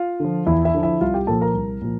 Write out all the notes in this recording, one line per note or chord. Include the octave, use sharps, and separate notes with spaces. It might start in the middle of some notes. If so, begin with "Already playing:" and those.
Already playing: F4 F5
D3 F3
E2 E4 E5
E4 E5
D3 F3
E4 E5
C2 F4 F5
G4 G5
A#2 F3 A4 A5
A#4 A#5
C2
A#2 F3